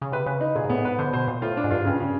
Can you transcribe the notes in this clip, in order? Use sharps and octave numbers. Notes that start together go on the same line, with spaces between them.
C#3
C3 B4
C#3 B4
D#4
A#2 G#4
G#2
A2 B3
G#2 B4
D3 C5
B2 C5
A#2 C5
A2 F4
D4
G#2
G2 F4
G2 C#3
C#3